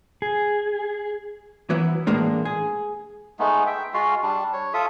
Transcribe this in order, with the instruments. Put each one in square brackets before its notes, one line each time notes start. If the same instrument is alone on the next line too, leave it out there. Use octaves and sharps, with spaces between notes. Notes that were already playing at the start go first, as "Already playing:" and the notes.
[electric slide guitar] G#4
[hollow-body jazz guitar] E3 F#3 B3 E4
A2 E3 G#3 A#3 D4
G#4
[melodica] G#3 A3 B3 D#4
E5 G5
G#3 F4 F#4 F5
G3 D4
C#5
F4 A4 E5 D#6